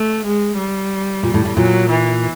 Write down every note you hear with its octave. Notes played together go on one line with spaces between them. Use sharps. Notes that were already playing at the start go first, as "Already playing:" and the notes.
Already playing: A3
G#3
G3
A#2
A2
A2
A#2 F#3
E3